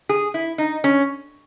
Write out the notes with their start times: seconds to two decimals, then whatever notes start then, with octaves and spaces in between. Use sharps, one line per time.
0.09 G#4
0.34 E4
0.58 D#4
0.84 C#4